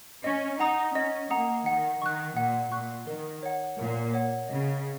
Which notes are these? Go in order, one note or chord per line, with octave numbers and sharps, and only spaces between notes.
C#4 D#5
D#4 F#5 A#5 D#6
C#4 D#5
A#3 F#5 A#5 D#6
D#3 F#5
D#3 C#6 F#6
A#2 F#5
A#2 C#6 F#6
D#3 A#4
C#5 F#5
A#2 A#4
C#5 F#5
C#3 D#5